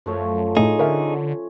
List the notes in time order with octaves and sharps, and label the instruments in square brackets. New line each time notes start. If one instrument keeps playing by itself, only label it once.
[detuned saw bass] F#2 [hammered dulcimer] F3 A3 C#5
[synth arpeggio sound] A2 A3 [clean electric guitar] D#4 G#4
[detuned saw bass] D3 [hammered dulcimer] C#4 [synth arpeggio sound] A#4 E5